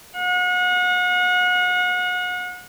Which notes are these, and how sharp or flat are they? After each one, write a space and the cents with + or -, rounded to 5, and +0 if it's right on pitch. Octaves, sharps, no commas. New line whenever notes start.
F#5 -35